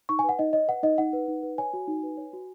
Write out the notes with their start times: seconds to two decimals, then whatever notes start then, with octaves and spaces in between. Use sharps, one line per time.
0.09 D#4 C#6
0.19 G#5
0.24 B4 F#5
0.39 D#4 D#5
0.53 C#5 D#5
0.68 B4 F#5
0.83 D#4 D#5
0.98 D#4 F#5
1.13 B4
1.28 D#4
1.43 B4
1.58 C#5 G#5
1.73 F#4
1.87 D#4
2.03 B4
2.17 C#5
2.33 F#4